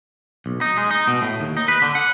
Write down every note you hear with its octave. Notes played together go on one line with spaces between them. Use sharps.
B1
D#4
G#3
D#4
B2
A2
D#2
D#4
B4
D3
F#5